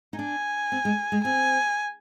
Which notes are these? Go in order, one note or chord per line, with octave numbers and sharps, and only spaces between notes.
D#4
D4 G#5
C4
G#3
G#3
C4 G#5